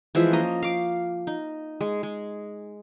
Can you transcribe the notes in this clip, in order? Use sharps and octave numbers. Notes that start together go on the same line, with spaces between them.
E3 F3 G#3 E5
A#3 C#4 D#5 A#5
F5 D6
D#4
G#3
G#3